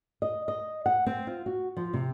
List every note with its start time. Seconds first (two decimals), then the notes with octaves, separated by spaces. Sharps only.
0.22 D#5
0.48 D#5
0.86 F#5
1.06 C4
1.27 F4
1.46 F#4
1.77 F3
1.93 C3